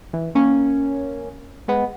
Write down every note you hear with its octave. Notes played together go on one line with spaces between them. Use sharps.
E3
A#3 C#4
G#3 B3